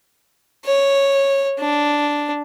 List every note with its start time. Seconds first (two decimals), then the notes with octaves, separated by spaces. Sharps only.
0.66 C#5
1.59 D4